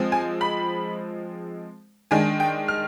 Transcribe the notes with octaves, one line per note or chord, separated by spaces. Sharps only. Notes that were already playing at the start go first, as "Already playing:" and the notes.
Already playing: F3 G#3 C4
G#5
B5
D#3 G#3 D4 G#5
G5
F6